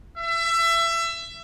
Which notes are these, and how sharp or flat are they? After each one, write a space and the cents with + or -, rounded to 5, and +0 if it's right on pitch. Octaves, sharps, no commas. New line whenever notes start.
E5 +25